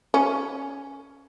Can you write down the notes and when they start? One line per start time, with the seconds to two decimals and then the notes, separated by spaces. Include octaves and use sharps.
0.14 C#4